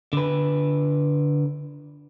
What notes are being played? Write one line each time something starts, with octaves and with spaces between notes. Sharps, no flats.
D3 B4